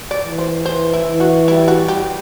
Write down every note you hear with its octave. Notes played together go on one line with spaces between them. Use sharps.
D5
E3
C5
E3 C5
E4
E3
F#4
G3 E4
F#4
G3 G4